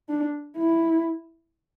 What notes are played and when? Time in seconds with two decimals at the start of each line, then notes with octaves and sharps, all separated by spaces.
0.09 D4
0.57 E4